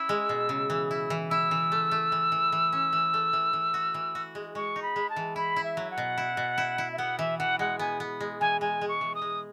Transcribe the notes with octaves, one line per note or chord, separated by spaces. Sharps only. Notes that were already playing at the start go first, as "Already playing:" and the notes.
Already playing: C#4 E4 E6
G#3
B2
C#3
E3
E4
E3
E4 E6
E3
A3
A3
E3
E3
E3
C#4
E3
A3
E3
E3
F#4
E3
F#4
G#3
G#3 C#6
D#4
B5
G#3
A5
E3
E4 B5
E4
E5
F#3
F#5
B2
E4
B2
E4
E4
E5
B3 F#5
E3 E5
E3 F#5
G#3 F#5
B3 G#5
B3
G#3
E3 G#5
G#3 G#5
G#3
C#6
E3
D#6
G#3